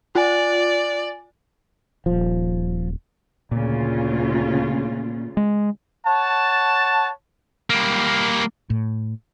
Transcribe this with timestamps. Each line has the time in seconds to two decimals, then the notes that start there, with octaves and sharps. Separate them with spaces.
0.15 F4 D5 G#5
2.06 D#1 F3
3.51 D2 A#2 C#3 F4
5.37 G#3
6.06 C#5 F#5 A5
7.70 G3 A#3
8.70 A2